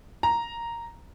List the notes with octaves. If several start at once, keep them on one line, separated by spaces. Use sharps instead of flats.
A#5